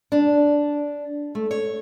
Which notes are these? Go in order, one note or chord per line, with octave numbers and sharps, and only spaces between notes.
D4
A3
C#5